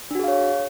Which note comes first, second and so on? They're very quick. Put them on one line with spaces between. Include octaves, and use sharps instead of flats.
D4 F#4 G#4 F5 C#5